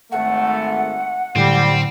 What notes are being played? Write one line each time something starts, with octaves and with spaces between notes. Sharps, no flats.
G#1 A3 F#5
A2 D3 F#3 G3 C4